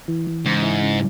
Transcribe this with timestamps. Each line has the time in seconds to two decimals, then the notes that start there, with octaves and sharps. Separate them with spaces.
0.08 E3
0.27 E3
0.45 G#2 C#3
0.63 E4
0.82 C#3